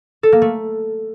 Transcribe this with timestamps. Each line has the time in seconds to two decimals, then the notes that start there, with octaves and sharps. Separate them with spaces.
0.23 A4
0.32 A#3
0.42 A3